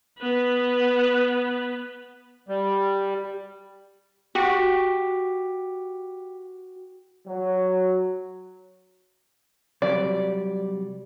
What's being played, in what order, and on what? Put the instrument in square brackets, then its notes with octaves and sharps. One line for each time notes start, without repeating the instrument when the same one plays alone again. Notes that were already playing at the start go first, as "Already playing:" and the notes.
[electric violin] B3 B4
[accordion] G3
[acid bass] F#4 [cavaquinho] G4 C#6
[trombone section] F#3
[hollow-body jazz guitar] C3 F#3 G3 [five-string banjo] D5